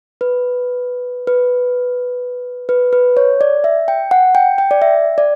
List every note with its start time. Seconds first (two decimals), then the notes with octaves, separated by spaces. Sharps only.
0.21 B4
1.27 B4
2.69 B4
2.93 B4
3.17 C#5
3.41 D5
3.64 E5
3.88 G5
4.11 F#5
4.35 G5
4.58 G5
4.71 D5
4.82 E5
5.18 D5